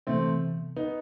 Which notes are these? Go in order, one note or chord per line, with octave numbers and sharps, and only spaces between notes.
C3 E3 A3 B3 C4
B3 D#4